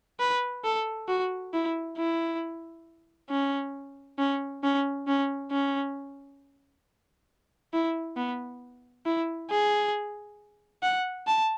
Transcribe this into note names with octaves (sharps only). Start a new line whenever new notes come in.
B4
A4
F#4
E4
E4
C#4
C#4
C#4
C#4
C#4
E4
B3
E4
G#4
F#5
A5